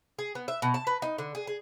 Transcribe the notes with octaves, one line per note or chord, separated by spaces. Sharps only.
G#4
B3
E5
B2
A5
B4
D#4
D3
G#4
G#4